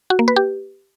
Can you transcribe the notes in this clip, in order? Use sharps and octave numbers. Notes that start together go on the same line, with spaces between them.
F#4
A#3
B4
G4